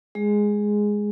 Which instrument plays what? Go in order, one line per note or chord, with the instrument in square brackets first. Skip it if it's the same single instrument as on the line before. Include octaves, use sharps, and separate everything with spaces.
[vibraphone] G#3 G#4